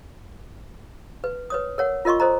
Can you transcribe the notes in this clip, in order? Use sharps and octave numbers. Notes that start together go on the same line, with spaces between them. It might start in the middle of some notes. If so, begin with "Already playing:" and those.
B4
B4 C#5 D#6
A#4 C#5 F#5
F4 A#4 D#5 C6 C#6
A4 C5 D#5 A#5